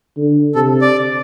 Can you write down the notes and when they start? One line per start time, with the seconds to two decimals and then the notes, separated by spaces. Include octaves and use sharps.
0.17 D3
0.55 C3 A4
0.81 D5